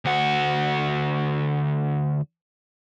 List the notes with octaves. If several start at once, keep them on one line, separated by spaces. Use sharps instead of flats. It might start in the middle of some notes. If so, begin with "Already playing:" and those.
D2 F#4